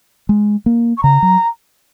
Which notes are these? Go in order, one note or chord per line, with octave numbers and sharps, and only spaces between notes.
G#3
A#3
C#6
C#3 A#5
F#3